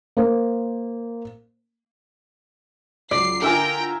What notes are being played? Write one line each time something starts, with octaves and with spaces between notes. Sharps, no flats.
A#3 C5
C#2 F#3 D5 C7
D3 E4 F4 A#4 E5 G5 G#5 A#5